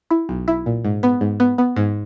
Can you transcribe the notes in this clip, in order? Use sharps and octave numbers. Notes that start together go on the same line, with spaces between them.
E4
B1
E4
A#2
G#2
B3
G#2
B3
B3
G#2